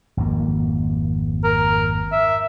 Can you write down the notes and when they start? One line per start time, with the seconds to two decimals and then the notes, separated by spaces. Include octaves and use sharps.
0.17 G#1 F2 A#3
1.44 A#4
2.12 E5